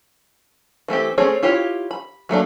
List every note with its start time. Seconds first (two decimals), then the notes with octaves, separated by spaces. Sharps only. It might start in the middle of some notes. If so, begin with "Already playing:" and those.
0.88 E3 A3 C4 G4
1.18 A3 C4 C#4 G#4 C#5
1.43 E4 F4 G4 C#5
1.91 B5
2.29 F#3 A3 A#3 D4